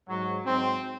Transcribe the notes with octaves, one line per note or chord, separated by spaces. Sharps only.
G#2 F#3
G#2 F#3 C4